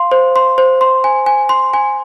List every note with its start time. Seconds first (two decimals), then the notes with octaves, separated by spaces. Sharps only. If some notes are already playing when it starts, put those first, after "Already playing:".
Already playing: F5 C6
0.12 C5
0.36 C6
0.58 C5
0.81 C6
1.04 G#5
1.26 G#5
1.49 C6
1.74 G#5